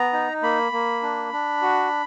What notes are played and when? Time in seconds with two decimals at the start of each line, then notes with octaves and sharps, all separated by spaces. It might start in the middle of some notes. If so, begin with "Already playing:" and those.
Already playing: B3 A#5
0.13 D#4
0.43 A#3 B5
0.72 A#3
1.03 D4
1.33 D4
1.62 F#4